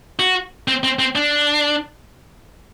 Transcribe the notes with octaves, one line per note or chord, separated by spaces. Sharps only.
F#4
C4
C4
C4
D4